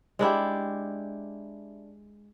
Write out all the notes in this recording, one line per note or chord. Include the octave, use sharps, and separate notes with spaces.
G#3 D4 E4 G4